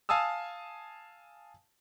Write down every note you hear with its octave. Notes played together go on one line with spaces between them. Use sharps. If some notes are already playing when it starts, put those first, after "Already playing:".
F5 G#5 A5 D#6 E6